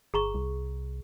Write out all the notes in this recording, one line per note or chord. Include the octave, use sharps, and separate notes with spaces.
G1 G#4 A#5 C#6
C2